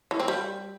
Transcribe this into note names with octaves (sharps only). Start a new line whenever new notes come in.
E3
C4
G3